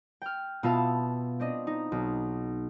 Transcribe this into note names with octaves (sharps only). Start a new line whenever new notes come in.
G5 F6
B2 B3 F4 E5 F5 A5
C4 D4 D#5
D#4
B1